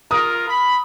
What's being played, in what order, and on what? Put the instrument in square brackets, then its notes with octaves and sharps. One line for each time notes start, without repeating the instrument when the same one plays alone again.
[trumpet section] F4 A#4 [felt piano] D#6
[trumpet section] B5